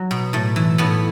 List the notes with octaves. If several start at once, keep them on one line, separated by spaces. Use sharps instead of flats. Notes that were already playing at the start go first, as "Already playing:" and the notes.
Already playing: F#3
B2
A2 A3
E3
A2 B3